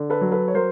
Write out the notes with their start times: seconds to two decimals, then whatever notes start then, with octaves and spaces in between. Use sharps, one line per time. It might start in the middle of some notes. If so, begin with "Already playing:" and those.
Already playing: D3
0.10 A4 B4
0.21 F#3
0.32 A4 B4
0.48 C#5
0.54 F#3 A#4 C5